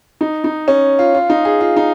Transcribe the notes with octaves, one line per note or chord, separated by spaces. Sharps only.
D#4
D#4
C#4
F4
F4
D#4
G#4
F4
D#4